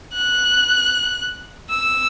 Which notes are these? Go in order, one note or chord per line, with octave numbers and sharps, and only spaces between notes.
F#6
E6